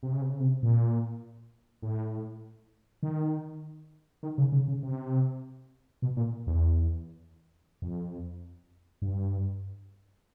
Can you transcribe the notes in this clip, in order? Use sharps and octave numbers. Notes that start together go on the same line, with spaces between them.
C3
C#3
C3
C#3
C3
A#2
A2
D#3
D#3
C#3
C#3
C#3
C3
B2
A#2
E2
F2
G2